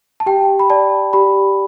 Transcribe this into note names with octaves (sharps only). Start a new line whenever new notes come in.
A5
G4 G5
B5
D5 A5
G4 B5